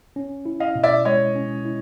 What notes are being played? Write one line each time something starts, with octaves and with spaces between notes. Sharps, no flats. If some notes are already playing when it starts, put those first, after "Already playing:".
C#4
E4
D#5 F5
B2
D5 E5
G#3 C#5 D#5
C#4
E4